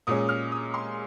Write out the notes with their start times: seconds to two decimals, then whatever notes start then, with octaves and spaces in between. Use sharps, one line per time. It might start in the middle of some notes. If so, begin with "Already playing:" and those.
0.07 A#2 G#3 C#4 D#6
0.29 F6
0.52 D#6
0.74 C6